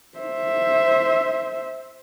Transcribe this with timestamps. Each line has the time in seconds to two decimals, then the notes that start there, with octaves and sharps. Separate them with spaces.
0.18 C5 E5